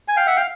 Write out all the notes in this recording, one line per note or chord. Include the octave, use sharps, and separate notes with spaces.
G#5
F5 G5
E5 F#5
F5 G5